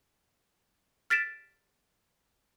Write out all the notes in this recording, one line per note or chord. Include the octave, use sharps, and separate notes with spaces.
F6 A6 B6 D7 E7